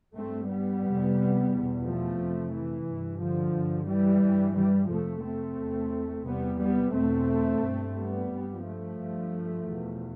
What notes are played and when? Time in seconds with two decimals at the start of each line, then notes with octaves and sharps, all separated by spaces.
0.15 G2 A3 C4
0.49 G3 B3
0.83 F2 C3
1.51 E2 B2
1.84 F3 A3
2.18 F2 C3
2.52 E3
2.86 G2
3.20 D3 F3
3.54 G2
3.87 E3 G3
4.22 G2
4.56 E3 G3
4.90 F2 C3 F3 A3
5.24 A3 C4
5.58 E2 C3
6.25 E2 C3 G3 B3
6.59 G3 B3
6.93 E2 B2 A3 C4
7.61 G2
7.95 G3 B3
8.29 G2
8.63 F3 A3
8.96 G2
9.65 E2 B2